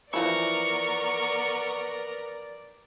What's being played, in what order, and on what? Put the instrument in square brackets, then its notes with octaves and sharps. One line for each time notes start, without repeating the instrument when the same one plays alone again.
[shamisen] E3 F3 E4 [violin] B3 A#4 [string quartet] D5 [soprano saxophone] C#6